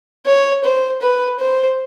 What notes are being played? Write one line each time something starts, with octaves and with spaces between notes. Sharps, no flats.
C#5
C5
B4
C5